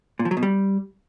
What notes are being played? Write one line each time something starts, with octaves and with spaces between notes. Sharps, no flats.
A#2
F3
F#3
B2
G3